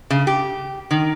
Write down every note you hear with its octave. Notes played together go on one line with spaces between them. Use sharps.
C#3
G4
D#3